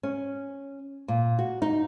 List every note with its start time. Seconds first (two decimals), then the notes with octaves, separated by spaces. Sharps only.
0.03 C#4
1.08 A#2
1.39 F#4
1.62 D#4